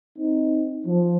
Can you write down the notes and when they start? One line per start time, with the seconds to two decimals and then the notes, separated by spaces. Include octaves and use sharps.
0.18 C4 D#4
0.87 F3